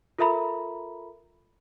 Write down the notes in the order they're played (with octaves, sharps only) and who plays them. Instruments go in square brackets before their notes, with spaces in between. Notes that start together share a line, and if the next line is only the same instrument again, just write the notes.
[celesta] F4 A4 A#4 E5 A#5 B5